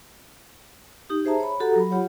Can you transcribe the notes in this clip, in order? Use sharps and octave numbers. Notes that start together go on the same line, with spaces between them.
D#4 G4 D#6
G#4 C5 E5 A5 A#5
C#5 B5
F#4 G4 A4 F#5 A#5
F#3 B5
F4 G4 C#5 F#5